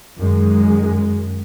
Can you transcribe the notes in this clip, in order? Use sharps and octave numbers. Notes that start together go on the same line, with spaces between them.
F#2 D#3 G#3